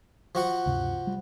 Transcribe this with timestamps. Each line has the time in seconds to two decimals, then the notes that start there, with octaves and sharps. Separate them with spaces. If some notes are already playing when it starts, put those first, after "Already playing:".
0.35 F3 F#4 F#5
0.66 D2 G2 C3
1.07 G3